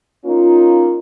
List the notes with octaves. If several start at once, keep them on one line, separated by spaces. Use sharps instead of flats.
A#3 C#4 D#4 F4